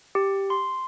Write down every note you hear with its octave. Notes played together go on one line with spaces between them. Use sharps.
G4
C6